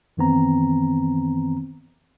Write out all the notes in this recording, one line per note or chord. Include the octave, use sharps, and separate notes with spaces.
F#2 D#3 E3 B3 C4 A#5